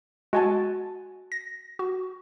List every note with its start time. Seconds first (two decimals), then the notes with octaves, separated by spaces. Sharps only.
0.33 G#3 F#4 G#5 A5
1.32 A#6
1.79 F#4